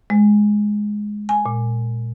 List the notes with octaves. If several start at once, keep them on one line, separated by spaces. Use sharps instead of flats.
G#3
G#5
A#2